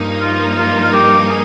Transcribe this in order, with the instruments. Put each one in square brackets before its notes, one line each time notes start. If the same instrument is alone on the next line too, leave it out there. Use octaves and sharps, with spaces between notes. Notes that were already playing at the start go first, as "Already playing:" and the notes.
Already playing: [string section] G2 F3 A#3 D#4
[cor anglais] F4
F4
F4
G4
G#4